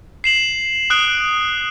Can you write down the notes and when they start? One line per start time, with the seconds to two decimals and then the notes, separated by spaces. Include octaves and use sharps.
0.24 C7 E7 F#7
0.90 D#6 F#6 D7